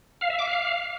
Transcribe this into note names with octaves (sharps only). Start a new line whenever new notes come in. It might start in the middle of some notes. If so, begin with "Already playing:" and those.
F5
E5
D6
F5